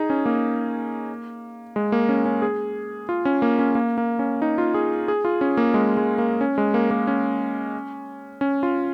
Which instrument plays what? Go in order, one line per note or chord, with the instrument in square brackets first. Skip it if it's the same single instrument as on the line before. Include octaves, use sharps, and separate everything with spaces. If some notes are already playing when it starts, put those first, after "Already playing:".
Already playing: [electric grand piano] D#4 G#4
C#4
A#3
G#3
A#3
C#4
C#4
G#4
F4
C#4
A#3
C#4
A#3
A#3
C#4
D#4
F4
G#4
G#4
F4
C#4
A#3
G#3
G#3
A#3
C#4
G#3
A#3
A#3
C#4
C#4
F4